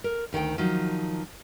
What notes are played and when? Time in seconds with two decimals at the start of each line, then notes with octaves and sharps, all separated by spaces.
0.04 A#4
0.33 D2 D#3 F#5 G5
0.58 D#3 F3 F#3 D#4